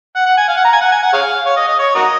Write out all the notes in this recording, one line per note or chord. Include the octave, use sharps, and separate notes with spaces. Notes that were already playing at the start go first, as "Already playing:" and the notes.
F#5
F#5
G#5
F5
F#5
A#5
G#5
F#5
G#5
F#5
G#4 C#5 F5
C#5
D#5
D#5
C#5
F#4 A#4 D#5